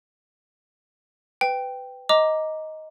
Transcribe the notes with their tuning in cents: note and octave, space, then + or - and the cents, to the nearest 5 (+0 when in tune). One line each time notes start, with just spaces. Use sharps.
B4 +20 G5 +0
D#5 +10 A#5 +0 D6 +0